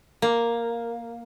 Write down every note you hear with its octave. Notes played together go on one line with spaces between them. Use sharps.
A#3